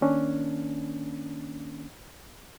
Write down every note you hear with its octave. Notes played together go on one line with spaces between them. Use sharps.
D#3 A#3 C#4 D4